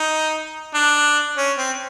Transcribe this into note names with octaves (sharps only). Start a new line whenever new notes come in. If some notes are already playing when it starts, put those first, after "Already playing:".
Already playing: D#4
D4
C#4
C4